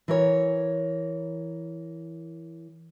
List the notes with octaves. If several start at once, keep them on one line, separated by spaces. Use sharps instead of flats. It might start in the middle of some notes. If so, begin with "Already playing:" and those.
E3 A#4 C#5